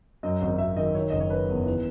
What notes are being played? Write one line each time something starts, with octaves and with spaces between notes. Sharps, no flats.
F#2 D#5
G#1 D#5
G#1 E5
D#3 D#5
D#3 C#5
F#1 D#5
C#5
D#3 B4
E2
E3 B4